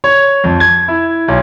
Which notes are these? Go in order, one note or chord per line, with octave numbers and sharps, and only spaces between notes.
C#5
F2
G#6
E4
B1